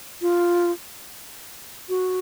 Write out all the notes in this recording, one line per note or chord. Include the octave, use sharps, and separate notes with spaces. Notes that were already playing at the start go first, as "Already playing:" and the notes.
F4
F#4